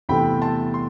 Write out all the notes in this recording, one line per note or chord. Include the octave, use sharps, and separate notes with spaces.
E2 C3 E3 A3 C4 G5 B5
A5 C6
C6